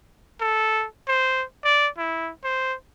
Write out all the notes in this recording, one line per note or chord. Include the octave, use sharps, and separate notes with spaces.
A4
C5
D5
E4
C5